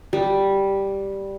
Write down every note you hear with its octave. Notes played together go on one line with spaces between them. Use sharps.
G3